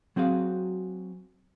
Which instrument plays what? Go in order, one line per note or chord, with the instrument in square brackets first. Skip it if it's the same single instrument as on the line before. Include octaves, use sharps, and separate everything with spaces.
[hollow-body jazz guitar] F#3 C4 F#4 G#4 F5